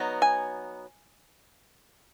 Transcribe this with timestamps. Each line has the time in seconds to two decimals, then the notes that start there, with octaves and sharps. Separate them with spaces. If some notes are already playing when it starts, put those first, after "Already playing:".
Already playing: F#3 B3 D#4
0.22 G#5